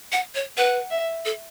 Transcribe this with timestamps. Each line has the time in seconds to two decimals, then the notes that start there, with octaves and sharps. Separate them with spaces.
0.12 F#5
0.35 C#5
0.57 B4 F#5
0.91 E5
1.25 A4